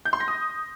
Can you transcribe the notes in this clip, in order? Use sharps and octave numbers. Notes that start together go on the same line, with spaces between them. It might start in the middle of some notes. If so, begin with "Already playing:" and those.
G6
C6
A#6
D#6